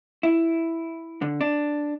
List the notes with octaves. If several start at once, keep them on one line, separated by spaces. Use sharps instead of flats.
E4
D3
D4